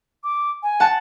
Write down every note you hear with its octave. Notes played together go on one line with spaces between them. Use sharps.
D6
G#5
F#5 A5